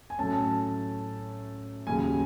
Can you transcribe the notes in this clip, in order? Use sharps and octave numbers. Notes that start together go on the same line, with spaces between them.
G#5
A2 F#3 A3 C#4 A5
D#2 C#3 F#3 G#5